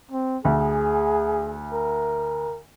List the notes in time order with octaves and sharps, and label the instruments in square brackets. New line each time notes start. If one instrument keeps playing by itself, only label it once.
[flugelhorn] C4
[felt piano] D2 [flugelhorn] G#4
[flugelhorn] A#4